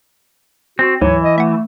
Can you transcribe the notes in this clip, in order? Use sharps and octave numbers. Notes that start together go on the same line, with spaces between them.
C4 F#4
D2 G#2 E3 F#3 C#5
D#5
A3 E5 F#5